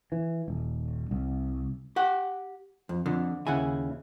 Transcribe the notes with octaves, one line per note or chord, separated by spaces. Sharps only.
E3
D#1
C2
G4 F#5
F2
F2 D3
D#2 C#3 E4 F#5 G#5